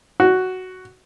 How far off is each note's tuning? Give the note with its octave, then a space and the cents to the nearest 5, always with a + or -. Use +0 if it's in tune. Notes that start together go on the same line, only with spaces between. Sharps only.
F#4 +5